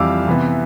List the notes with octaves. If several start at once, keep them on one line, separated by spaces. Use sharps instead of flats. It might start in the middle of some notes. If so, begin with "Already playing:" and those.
Already playing: F2 E3 G3 F5 D6 E6
C3 E3 B3